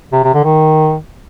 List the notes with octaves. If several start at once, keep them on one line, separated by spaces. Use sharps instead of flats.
C3
C3
D3
D#3